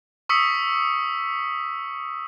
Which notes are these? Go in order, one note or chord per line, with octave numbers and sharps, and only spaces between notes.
C#6 D#6 E6 B6 C#7